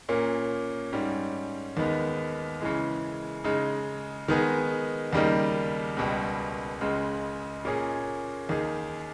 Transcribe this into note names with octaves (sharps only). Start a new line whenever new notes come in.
A#2 A#3 C#4
G#2 G3 C#4
D#2 D#3 G#3 B3
C#3 E3 G#3
C#3 G#3 D#4
D#3 G#3 B3 D#4 G#4
D#2 C#3 G3 A#3 D#4
C#2 B2 G3
C#2 C#3 G#3
A#2 A#3 C#4 G#4
D#2 D#3 A#3 D#4 G#4